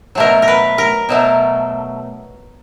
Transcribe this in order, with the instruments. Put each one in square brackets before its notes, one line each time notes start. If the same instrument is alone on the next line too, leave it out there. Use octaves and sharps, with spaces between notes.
[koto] B2 F#3 A3 A#4
A#4
B4
A#4
B2 F#3 A3